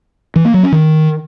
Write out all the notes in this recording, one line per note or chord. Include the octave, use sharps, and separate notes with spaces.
E3
A#3
F#3
C#4
D#3